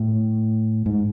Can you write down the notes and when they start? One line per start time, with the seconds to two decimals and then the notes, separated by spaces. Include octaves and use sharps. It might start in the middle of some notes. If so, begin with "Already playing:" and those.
Already playing: A2
0.86 G#2